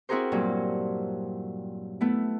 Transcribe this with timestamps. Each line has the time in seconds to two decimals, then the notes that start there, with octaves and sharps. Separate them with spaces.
0.09 C4 E4 F#4 G#4 A#4 C5
0.32 G2 A#2 F#3
2.01 A3 B3 E4